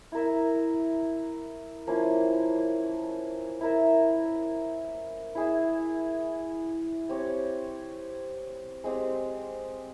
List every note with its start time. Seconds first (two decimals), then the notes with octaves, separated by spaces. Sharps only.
0.12 E4 A#4 E5
1.87 F3 A#3 C#4 E4
3.61 E4 A#4 E5
5.35 E4 G#4 E5
7.09 C4 G4 C#5
8.84 G#3 C4 G4